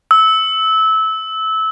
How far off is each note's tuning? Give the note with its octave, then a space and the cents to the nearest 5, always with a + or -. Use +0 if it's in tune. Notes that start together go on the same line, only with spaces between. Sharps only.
E6 -20